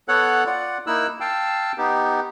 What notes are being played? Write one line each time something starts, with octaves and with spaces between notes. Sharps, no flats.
B3 A4 C#5 F#5 F#6
F4 D5 F#5
A#3 D#4 E4 E6 F#6
F5 G5 A5 E6
B3 D#4 G4